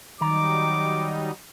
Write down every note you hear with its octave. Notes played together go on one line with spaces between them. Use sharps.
D#3 F#3 G3 D#4 A#5 D6